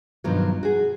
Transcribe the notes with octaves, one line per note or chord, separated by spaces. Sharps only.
G2 B2 D#3 F3 F#3
F#4 G#4